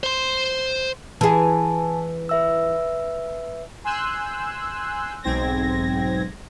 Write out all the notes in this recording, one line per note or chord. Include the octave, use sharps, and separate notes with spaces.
C5 C6
E3 G#4 G#5 A5
B4 E5 E6
G#5 C6 E6 F#6 G6
B1 G#2 C4 G#6 A#6